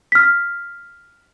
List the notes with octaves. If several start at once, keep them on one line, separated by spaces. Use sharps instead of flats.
F6 B6